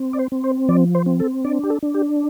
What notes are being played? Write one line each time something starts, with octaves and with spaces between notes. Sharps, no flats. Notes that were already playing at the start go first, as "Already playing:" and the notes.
Already playing: C4
D5
C5
C4
C5
F3 D5
C5
C4
A4
D4 D5
G4
A4
D4
G4